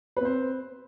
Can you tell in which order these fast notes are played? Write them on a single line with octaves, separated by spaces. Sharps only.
B4 C4 C5